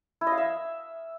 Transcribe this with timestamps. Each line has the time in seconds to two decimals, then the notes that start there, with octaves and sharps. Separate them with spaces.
0.21 E4
0.27 D#5
0.32 F5
0.38 E5